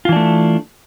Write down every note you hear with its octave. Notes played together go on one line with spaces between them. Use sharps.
E3 A3 D4 F4